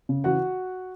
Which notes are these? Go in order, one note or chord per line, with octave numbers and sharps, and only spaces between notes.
C#3
E3 F#4 F#5